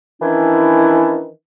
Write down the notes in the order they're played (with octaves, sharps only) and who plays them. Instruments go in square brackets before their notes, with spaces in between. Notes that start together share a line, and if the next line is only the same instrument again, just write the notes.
[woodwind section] D#3 E3 C#4 D4 E4